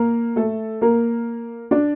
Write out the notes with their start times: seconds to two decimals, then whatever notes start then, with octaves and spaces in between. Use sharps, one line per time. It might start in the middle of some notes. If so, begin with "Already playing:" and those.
Already playing: A#3 A#4
0.36 A3 A4
0.82 A#3 A#4
1.71 D4 D5